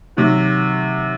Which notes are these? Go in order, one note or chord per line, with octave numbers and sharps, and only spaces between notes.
C3 D#3 F#3